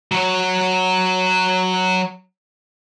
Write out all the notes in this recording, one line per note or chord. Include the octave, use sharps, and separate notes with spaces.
F#3 C#5